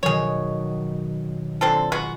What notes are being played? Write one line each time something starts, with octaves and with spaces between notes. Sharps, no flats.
B2 D#3 F#3 G#4 C#5
D3 C4 F4 A4
G#3 B3 F#4